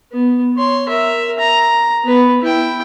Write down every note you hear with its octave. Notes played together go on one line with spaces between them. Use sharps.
B3
C#5 C6
A#4 E5
A#5
B3 B4
E4 G5